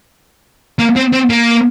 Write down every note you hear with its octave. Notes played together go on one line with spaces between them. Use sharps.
A#3
C4
C4
A#3